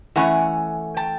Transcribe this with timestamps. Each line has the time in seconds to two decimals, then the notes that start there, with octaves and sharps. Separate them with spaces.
0.16 E3 A3 C#4 F#5 G#5
0.97 G5 A5